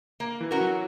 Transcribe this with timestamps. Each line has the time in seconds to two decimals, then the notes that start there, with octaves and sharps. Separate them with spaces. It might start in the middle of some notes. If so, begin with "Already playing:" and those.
0.20 A#3
0.41 E3
0.51 C#4 F#4 A#4
0.61 F#3